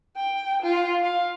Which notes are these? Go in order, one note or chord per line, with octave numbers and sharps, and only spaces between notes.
G5
F4
F5